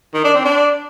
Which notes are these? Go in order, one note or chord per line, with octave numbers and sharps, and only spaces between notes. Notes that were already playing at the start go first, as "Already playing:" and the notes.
D#3
D4
C4
D4